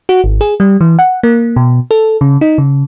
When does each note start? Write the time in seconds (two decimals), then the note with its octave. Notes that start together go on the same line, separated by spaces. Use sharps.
0.09 F#4
0.24 G#1
0.41 G#4
0.60 G3
0.81 E3
0.99 F#5
1.23 A#3
1.56 B2
1.91 A4
2.21 C#3
2.41 D#4
2.58 C#3